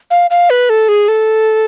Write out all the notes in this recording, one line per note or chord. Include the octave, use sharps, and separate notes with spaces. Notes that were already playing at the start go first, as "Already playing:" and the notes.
F5
F5
B4
A4
G#4
A4